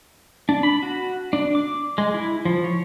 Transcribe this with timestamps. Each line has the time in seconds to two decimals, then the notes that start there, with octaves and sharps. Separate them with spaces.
0.49 D4
0.63 B5
0.83 F#4
1.33 D4
1.55 D6
1.98 G#3
2.14 E4
2.45 F3
2.64 C#5